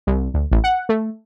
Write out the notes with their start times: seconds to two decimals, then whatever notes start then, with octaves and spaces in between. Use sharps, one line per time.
0.07 C2
0.34 D2
0.52 A1
0.64 F#5
0.89 A3